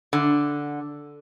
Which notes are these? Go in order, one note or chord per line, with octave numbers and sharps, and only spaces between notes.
D3